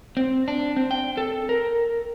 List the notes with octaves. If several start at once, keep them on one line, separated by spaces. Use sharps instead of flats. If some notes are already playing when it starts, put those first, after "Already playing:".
C4
D4
C4
G5
A4
A#4